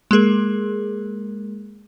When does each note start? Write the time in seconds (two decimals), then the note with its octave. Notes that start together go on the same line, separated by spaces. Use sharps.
0.11 G#3 A#3 G#4 A#4